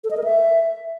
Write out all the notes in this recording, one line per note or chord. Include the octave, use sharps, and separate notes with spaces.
A4
D#5
A#4
E5